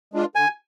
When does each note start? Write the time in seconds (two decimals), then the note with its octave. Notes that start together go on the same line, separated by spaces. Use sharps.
0.14 G#3 D4 F4
0.35 D3 G#5